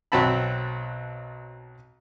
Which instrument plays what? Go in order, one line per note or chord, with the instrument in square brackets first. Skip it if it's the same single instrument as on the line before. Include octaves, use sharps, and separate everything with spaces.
[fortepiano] B1 F#3 C4 A5 B5